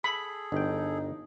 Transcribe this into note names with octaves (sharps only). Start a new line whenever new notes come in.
G#4 A4 B5
G1 D#4 G5